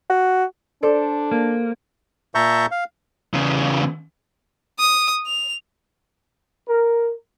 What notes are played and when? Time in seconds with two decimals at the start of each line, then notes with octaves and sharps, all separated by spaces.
0.10 F#4
0.83 D4 A4 C5 D5
1.31 A#3
2.35 A#2 E5 A5 A#5 C#6 G6
2.71 F5
3.34 E2 C#3
4.79 D#6
5.27 F7
6.68 A#4